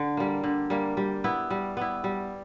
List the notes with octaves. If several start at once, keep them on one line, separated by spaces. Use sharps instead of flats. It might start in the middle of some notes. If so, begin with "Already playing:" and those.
Already playing: D3
G3 A#3
D3
G3 A#3
G3
B3 E4
G3
B3 E4
G3